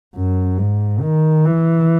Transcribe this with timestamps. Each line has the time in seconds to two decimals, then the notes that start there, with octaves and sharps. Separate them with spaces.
0.15 F#2
0.58 G#2
1.01 D#3
1.45 E3